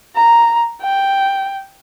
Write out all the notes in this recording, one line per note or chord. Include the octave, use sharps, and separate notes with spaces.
A#5
G5